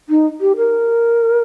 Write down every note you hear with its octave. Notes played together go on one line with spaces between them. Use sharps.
D#4
G4
A#4